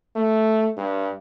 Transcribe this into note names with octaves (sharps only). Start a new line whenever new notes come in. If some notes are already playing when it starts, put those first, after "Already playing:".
A3
G2